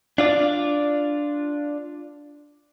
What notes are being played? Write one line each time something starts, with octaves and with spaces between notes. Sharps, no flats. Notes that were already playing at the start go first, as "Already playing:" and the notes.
D4 F4 D5